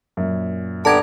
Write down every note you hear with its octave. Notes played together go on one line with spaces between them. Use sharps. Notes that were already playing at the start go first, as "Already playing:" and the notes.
F#2 A#2
D3 B3 G4 A5 A#5 G#6 D7